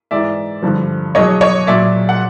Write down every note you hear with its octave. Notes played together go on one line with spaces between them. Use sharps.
G#2 E3 D5 E5
G2 D3 F3
E2 B2 F#3 C#5 D#5
C#5 D#5
A#2 F#3 D5 E5
F#5